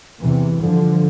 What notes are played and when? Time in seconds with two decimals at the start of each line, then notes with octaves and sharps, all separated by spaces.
0.21 E2 C3 E3
0.62 G2 D3 F3